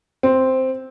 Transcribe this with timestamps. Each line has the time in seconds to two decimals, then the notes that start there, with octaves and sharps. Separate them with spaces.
0.23 C4